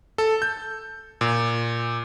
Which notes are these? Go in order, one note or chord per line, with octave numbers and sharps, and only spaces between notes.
A4
G6
A#2